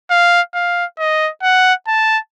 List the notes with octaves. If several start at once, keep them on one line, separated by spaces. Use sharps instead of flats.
F5
F5
D#5
F#5
A5